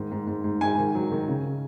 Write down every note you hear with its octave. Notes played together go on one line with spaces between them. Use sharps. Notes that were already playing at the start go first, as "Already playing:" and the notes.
Already playing: G#2 D#3
G#2
G#2
G#2
G#2 G#5
D#3
F#3
D#3
C#3